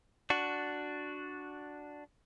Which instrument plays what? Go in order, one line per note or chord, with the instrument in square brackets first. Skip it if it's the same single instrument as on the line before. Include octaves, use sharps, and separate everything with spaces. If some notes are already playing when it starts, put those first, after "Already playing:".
[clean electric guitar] D4 F#4